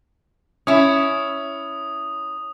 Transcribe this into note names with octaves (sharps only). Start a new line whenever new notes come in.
C#4 E4 D#6